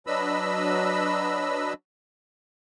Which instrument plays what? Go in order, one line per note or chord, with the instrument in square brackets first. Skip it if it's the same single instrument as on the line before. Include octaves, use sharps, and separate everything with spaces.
[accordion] F#3 D4 B4 D#5 B5 E6